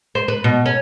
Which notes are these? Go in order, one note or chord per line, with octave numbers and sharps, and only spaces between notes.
C5
B4
B2
C#4